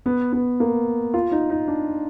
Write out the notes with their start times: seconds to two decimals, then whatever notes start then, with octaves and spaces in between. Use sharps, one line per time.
0.06 B3
0.33 B3
0.60 A#3
1.14 F4
1.32 D#4
1.50 D#4
1.68 D4